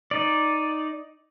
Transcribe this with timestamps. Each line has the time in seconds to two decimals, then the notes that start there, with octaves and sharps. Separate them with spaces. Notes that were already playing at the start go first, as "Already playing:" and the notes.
0.11 D#4 D5